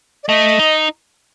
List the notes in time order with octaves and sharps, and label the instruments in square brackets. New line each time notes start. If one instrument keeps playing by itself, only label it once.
[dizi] D5
[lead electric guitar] A3 [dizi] D#5
[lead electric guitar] D#4